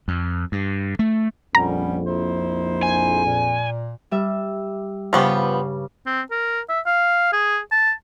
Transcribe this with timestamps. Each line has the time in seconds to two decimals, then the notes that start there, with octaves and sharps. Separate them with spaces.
0.08 F2
0.52 G2
0.99 A3
1.55 A#1 F2 G3 B3 C#4 A#5
2.06 D#4 E4 C5
2.83 G#5
3.25 A#2
4.11 G3 E5
5.13 G2 C#3 F3 B3 G4 C#6
6.06 C4
6.31 A#4
6.69 E5
6.86 F5
7.33 G#4
7.72 A5